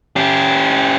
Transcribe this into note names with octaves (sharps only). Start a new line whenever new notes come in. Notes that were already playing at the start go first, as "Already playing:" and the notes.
C#4 G4